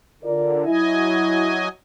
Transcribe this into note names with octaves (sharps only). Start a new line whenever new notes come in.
D3 F4 A#4 D5
F#3 E4 D#5 G#5